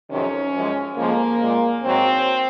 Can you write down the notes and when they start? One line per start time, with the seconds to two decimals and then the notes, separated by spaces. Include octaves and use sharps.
0.10 F2 C3 D#3 F#3 C#4
0.53 F#2 F3 G#3
0.96 F2 C#3 F3 G#3 A#3
1.41 A#2 G#3
1.83 G#2 F#3 C4